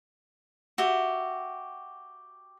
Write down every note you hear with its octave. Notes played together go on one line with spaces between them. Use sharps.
F#4 G4 E5